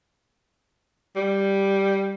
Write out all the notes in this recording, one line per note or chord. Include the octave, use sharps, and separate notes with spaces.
G3